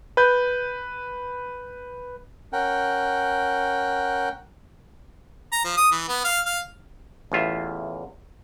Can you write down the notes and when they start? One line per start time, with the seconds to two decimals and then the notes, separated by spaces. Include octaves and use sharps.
0.17 B4 G6
2.53 C#4 A#4 F#5 G5
5.52 A#5
5.64 F3
5.77 D#6
5.92 E3
6.08 B3
6.24 F5
6.45 F5
7.32 A1 E2 F4 E5